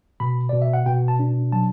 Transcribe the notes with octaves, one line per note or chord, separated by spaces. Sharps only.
B2 B5
B2 D5
E5
F#5
B2 G5
A5
D4
F#3 A5